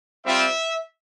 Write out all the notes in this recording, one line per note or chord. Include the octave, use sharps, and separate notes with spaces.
G3 C4 F4 E5